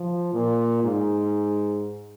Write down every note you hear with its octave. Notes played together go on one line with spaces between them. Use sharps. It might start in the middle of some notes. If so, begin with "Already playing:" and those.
Already playing: F3
A#2
G#2